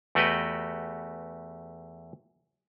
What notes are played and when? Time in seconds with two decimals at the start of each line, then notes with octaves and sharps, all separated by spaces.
0.15 E2 A3 F#4 G4 B4 D#5